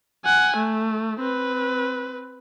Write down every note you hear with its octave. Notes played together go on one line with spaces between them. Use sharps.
F#5 G#5
A3
C4 B4